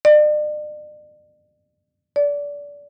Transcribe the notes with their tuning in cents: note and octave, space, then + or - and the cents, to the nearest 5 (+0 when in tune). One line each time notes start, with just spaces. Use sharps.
D5 +40
D5 -25